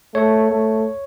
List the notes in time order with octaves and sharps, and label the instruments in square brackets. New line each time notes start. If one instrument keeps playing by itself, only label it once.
[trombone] A3 [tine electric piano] C#5
[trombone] A3